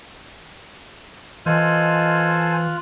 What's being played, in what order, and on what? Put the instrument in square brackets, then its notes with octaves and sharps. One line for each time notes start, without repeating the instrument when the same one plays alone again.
[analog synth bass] E3 [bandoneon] F4 F6 F#6 [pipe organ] A4 C5 G#5 [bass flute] D#5